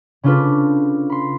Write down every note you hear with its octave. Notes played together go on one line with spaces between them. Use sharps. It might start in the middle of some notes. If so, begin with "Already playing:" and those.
C#3 C#4 D4 F4 A4 B4
B5 C6